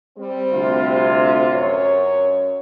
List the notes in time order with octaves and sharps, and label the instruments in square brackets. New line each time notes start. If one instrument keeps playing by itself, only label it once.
[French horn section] G3 C4
[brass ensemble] D2 C3 F4
[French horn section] F#2 C#5